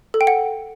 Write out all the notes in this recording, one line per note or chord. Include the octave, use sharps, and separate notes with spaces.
A4
G5
F#5